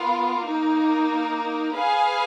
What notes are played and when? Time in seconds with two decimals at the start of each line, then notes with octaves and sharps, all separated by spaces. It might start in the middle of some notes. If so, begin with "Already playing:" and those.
Already playing: B3 F4 A#4 F5
0.44 A#3 D#4 A#4
1.76 G#4 B4 F5 G#5